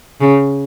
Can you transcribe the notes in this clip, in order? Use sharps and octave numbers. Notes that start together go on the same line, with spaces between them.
C#3